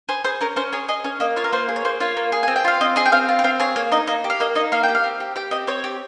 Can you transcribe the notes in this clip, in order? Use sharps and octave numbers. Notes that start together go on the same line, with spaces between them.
G#4 C5
G#4 C5
C#4 A#4
C#4 C5
G#4 C#5
G#4 D#5
C#4 C#5
A#3 D#5
F4 C#5
A#4
A#3 C5
G#4
C#5
A#3 C5
F4 C#5
A#3
G#4
C4 G#5
G5
F4 F5
C4 D#5
G#4 D#5
G5
C4 F5
F4
G5
C4 F5
G#4 C#5
A#3 C#5
D#4 D#5
A#3 D#5
G4
F5
A#3 D#5
D#4 D#5
A#3 F5
G4 G5
F5
C4
G4
G4 G5
C4 D#5
C4 C#5
G4